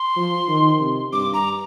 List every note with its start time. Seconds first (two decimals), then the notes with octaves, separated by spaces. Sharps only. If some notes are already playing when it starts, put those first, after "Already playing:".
Already playing: C6
0.16 F3
0.48 D#3
0.80 C3
1.12 G2 D6
1.34 A#5